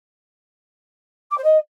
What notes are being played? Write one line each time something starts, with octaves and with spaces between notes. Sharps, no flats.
D6
C5
D#5